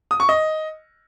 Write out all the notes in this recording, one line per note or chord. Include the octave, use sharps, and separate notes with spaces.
D#6
C#6
D#5